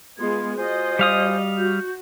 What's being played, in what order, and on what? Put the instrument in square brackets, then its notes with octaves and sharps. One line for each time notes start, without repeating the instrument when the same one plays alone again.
[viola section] G#3 B3 F4 [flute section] C6 G#6
[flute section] F4 C5 G#5 [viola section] F#4 D#5
[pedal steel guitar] G3 F5 D#6
[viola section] F#4 [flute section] G6